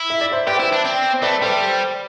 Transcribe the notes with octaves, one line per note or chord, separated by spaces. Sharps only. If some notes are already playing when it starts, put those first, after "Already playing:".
Already playing: E4
E5
D5
C5 E5
G4 B4 D5
E4
D4
C4
A3 B4 D5
G3 A4 C5